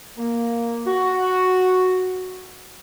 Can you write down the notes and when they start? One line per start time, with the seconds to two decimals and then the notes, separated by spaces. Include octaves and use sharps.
0.17 A#3
0.86 F#4